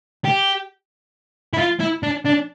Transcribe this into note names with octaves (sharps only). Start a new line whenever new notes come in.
G4
E4
F4
E4
D4
D4